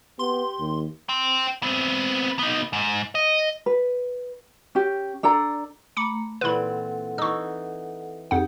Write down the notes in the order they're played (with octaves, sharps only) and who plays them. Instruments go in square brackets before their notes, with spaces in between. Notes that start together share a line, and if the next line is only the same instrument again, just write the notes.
[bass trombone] B3 [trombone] G4 [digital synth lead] C6
[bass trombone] D#2
[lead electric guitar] G5 C6
B3 C4
B3 D#4
G#2
D#5
[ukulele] B4
C#4 G4
D4 A4 D5 A#5
[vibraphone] A3 A#5 [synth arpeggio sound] B5 D6 C#7
[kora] A#2 E3 C4 [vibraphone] A4 F#5 [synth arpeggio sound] B4 B5
[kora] E3 D#4 [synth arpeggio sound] C#6 E6
[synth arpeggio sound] F2 F#5 [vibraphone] D#4 G4 G#4